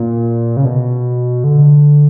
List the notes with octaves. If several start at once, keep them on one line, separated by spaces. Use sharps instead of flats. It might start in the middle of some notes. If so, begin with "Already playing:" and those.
Already playing: A#2
C#3
B2
D3